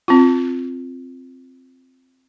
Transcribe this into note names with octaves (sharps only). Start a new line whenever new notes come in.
C4 F4